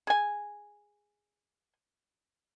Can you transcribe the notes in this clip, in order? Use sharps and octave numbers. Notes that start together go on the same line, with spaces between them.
G#4 G#5